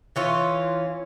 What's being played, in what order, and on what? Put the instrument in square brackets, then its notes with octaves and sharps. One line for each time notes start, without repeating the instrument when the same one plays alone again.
[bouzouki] E3 C#4 F4